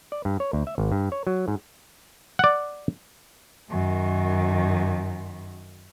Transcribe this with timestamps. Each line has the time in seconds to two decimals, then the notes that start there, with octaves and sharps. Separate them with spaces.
0.12 D5
0.25 G2
0.40 C#5
0.53 D2
0.67 E5
0.78 G#1
0.92 G2
1.12 C#5
1.27 F#3
1.48 G#2
2.39 D5 F#5
3.70 F#2 D#3